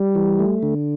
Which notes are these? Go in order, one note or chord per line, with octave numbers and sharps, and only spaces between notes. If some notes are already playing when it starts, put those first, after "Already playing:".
Already playing: G3
E3
A3
D3